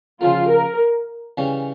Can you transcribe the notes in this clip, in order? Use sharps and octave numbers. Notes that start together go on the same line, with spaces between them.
C#3 F3 A#3 F4
A#4
C#3 E3 G3 C#4